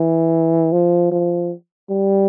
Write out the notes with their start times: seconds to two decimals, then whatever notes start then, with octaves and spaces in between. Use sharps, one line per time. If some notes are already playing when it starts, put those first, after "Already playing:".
Already playing: E3
0.72 F3
1.12 F3
1.90 G3